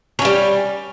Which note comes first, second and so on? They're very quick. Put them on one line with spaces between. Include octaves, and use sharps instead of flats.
C#4 F#3 G3